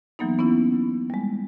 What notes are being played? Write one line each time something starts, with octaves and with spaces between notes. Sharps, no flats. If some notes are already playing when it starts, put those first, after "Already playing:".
E3 F#3 A#3 B3 D#4
B3 C#4 E4
G3 G#3